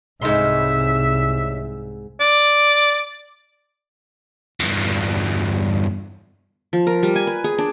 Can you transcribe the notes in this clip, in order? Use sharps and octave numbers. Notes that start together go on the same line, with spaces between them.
C2 G#2 C#3 D#4 D#5 E5 C6
D5
E2 G2
F3
A#4
G3
G#5
B4
G#4
D4